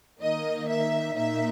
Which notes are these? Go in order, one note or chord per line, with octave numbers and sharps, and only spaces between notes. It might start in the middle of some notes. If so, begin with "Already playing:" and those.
D#3 A#3 D#4 D#5
E5
A#2 A#3 D#4 E5